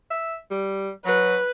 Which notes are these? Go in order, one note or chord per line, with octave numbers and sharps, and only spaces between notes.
E5
G3
F#3 B4